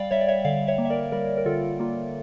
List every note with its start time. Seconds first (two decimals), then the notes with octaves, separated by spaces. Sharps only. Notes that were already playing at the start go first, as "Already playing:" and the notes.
Already playing: G3 D5 F5 G5
0.11 G3 C#5 E5
0.21 D5
0.28 C#5 E5
0.45 D3 D5 F5
0.67 C#5 E5
0.78 A#3
0.85 E5
0.90 A#4 D5
1.12 G3 A#4 D5
1.37 A#4
1.46 D3 F4 A4
1.79 A#3 F4